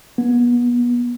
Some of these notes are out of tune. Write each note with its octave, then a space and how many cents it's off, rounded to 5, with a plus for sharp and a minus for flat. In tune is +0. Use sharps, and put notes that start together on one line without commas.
B3 -30